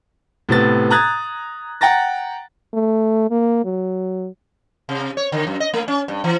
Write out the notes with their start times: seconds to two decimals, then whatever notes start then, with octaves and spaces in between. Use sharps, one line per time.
0.49 A2 C3 B3 A6
0.90 A#5 D#6 F#6 G#6 A6
1.81 F#5 G5 A#5 A6 A#6
2.73 A3
3.30 A#3
3.65 F#3
4.89 C3
5.17 C#5
5.32 D3
5.47 F#2
5.60 D#5
5.74 A3
5.88 C#4
6.08 G2
6.24 E3